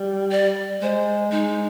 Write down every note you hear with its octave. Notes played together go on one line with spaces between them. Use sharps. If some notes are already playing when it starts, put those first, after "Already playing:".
Already playing: G3
D5
G#3 C5
G#3 D#4